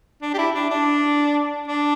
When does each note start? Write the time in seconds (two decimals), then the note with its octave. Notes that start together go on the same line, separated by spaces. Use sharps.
0.22 D4
0.34 G4
0.38 E4
0.55 D4
0.70 D4
1.68 D4